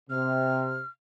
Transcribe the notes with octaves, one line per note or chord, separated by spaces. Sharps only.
C3 F6